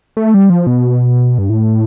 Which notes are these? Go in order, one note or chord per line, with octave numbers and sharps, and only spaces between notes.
A3
G3
F3
B2
G2
A2